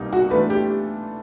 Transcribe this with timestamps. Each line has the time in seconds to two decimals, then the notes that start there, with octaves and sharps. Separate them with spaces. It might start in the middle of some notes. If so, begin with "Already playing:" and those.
Already playing: C2 B2 G3 A#3 D#4
0.13 F#4
0.31 E3 A3 D4 F4 A4 B4
0.50 G4